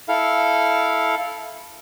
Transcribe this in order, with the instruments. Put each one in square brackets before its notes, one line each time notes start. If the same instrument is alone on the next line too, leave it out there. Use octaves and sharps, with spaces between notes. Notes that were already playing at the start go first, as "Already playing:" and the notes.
[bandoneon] E4 A4 F5